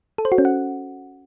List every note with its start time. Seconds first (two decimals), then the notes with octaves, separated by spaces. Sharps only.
0.18 A4
0.25 C5
0.32 F#4
0.38 C#4
0.45 F#5